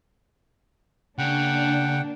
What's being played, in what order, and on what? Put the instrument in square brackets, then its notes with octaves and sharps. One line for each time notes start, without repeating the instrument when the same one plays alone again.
[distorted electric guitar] C#3 [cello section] A#3 D4 [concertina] F#5 G5